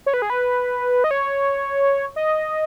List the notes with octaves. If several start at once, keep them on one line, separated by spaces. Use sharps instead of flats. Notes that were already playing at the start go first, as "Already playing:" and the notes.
C#5
B4
G#4
B4
D#5
C#5
D#5